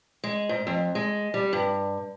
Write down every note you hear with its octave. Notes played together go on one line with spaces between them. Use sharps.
G#3
G#2
F2
G#3
G3
G2